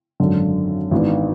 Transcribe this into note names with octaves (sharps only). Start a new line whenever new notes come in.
G#1 F#2 D3
G#1 G#2 E3 B3 D4